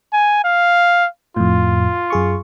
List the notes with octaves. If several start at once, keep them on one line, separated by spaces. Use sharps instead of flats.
G#5
F5
F2 A2 F4
F#2 G#4 C#6